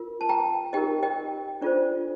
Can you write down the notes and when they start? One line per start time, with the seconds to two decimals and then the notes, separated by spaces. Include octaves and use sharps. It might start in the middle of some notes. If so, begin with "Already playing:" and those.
Already playing: F4 A#4
0.21 A5
0.29 G5 A#5
0.73 D#4 G4 A#4 D#5 G5
1.03 D#5 G5
1.62 D4 F4 A4 C5 D5